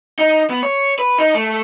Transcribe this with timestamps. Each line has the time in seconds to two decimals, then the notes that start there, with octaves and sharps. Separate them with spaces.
0.19 D#4
0.50 B3
0.63 C#5
0.99 B4
1.18 D#4
1.35 A3